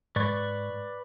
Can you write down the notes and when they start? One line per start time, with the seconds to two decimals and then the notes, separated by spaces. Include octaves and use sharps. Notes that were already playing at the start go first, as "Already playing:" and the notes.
0.16 G#2 B4 D5 C#6